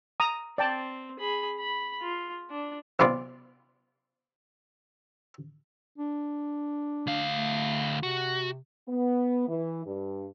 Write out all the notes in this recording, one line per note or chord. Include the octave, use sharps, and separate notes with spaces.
A#5 D#6
C4 D5 G5 A5
G#4 B5
B5
F4
D4
B1 C3 B3 F4 D5 D6
D4
D2 F5
A3
C3 F#4
B3
E3
G2